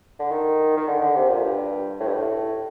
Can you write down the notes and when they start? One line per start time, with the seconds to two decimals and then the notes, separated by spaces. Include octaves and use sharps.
0.19 D3
0.31 D#3
0.77 D#3
0.87 D3
1.01 D3
1.16 C3
1.29 A#2
1.43 G2
2.00 A2
2.07 G2
2.14 A2